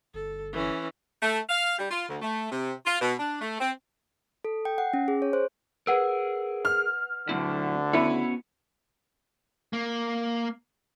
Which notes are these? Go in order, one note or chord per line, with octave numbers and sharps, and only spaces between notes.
G1 A4
E3 C#4
A3
F5
G3
F4
D2
A3
C3
F4
B2
D4
A3
C4
A4
G5
F#5
C#4
G#4
C#5
C5
G#4 A#4 B4 F#5 E6
F6
D2 D3 F#3 C4 E4
B3 C#4 E4 F#4
A#3